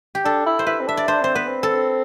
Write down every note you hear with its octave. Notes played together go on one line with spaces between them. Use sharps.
G4
D4 A4
E4
C5
E4 B4
C4
D4 E5
D5
D4 C5
C4 C5
B3 B4
C4
A4